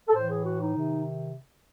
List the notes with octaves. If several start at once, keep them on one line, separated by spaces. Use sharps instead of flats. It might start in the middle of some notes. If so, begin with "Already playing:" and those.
A4
A2 E3 C5
G#4
F#4
D#4
C3 D#3